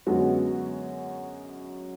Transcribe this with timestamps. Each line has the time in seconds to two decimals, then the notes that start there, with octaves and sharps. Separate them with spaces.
0.06 F#2 D3 G#3 B3 F#4